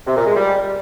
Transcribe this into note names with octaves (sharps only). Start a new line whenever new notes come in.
C3
A#2
G#3
G3